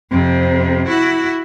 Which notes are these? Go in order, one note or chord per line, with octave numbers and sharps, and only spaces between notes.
F2 C3
E4 F#4